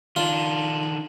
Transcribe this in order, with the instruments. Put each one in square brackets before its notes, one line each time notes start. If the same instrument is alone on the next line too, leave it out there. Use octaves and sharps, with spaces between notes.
[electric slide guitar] D#3 D4 [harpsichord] F4